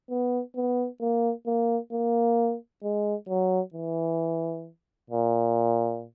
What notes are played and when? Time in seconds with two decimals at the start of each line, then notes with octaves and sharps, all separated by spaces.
0.10 B3
0.56 B3
1.01 A#3
1.47 A#3
1.92 A#3
2.84 G#3
3.29 F#3
3.74 E3
5.10 A#2